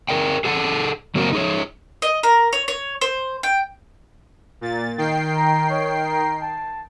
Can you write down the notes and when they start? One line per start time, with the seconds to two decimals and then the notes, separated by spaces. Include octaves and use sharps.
0.09 G#4 A#4 D5 G5
0.44 G#4 A4 F#5 G#5 A5
1.15 C#3 F#3 A#3 C4 F#4 A#4
1.33 D#4 G#4 C#5
2.02 D#5
2.23 A#4
2.53 C#5
2.68 C#5
3.01 C5
3.43 G5
4.61 A#2 A6
4.98 D#3 G5 C7
5.37 A#5
5.70 C#5
6.07 A#5
6.42 A5